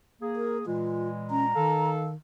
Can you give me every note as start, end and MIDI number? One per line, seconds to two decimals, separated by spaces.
0.22 0.63 58
0.22 0.63 68
0.36 0.58 70
0.66 1.51 46
0.66 1.51 52
0.66 1.51 56
0.66 1.09 65
1.30 1.46 61
1.30 1.91 82
1.55 2.15 51
1.55 2.09 69
1.55 2.09 77